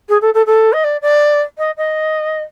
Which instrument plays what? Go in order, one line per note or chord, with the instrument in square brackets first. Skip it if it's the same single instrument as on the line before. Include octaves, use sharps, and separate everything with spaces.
[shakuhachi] G#4
A4
A4
A4
D#5
D5
D5
D#5
D#5